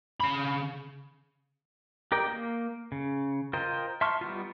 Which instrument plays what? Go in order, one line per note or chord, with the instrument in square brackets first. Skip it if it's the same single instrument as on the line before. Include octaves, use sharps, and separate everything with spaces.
[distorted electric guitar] C#3 B5
[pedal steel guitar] G4 A#4 D5 D#5 G5
A#3
C#3
F4 A#4 C5 D#5 G5
E5 A5 C6 C#6 F6
G3 B3 D#4 F4